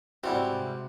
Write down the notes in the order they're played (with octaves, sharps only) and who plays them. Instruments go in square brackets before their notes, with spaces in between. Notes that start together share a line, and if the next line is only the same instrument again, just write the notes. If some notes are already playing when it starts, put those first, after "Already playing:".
[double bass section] G#2 C3 [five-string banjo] E3 G3 E4 [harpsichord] C4 [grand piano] F#4 D5